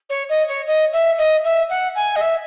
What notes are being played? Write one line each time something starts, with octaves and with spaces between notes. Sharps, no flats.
C#5
D#5
C#5
D#5
E5
D#5
E5
F#5
G#5
D#5
E5